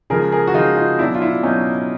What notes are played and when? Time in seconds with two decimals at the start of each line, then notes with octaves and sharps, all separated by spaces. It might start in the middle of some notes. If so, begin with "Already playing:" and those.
0.10 C#3 F3 G#3 G#4 A#4
0.32 G#4 A#4
0.47 F#4
0.54 C#3 F3 G#3 D#4 F4
0.76 D#4 F4
0.99 B2 D4 E4
1.03 F#3
1.15 F4
1.22 D4 E4
1.43 B2 F#3 C#4 D#4